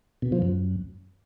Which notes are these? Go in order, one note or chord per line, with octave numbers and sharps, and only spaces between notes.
B2
F3
F#2